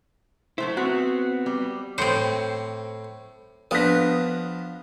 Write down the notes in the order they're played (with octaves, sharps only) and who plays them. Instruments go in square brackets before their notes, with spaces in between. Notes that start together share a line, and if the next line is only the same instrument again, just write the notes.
[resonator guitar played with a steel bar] F#3 A3 C5 [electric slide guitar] E4
[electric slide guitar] B3 C4 [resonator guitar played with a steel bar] F#4
[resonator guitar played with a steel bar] G3
[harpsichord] A2 [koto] C4 C5 [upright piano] C#7
[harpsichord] F3 [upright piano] B3 D4 [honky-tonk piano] D#6 F#6 A#6